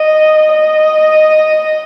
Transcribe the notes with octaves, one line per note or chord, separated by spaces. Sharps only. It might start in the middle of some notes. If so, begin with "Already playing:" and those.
Already playing: D#5
D#5